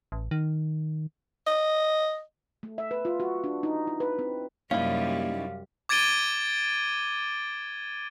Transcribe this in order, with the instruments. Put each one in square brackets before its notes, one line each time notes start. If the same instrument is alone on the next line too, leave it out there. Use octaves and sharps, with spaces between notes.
[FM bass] A1
D#3
[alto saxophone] D#5
[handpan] A3
E5
B4
F4
F#4
D4
D#4
E4
B4
C4
[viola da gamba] F#2 C3 G3 [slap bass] A#3 [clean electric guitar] C#4 D#4 E4 [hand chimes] F5
[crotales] D6 G#6 A6 D7 D#7 G7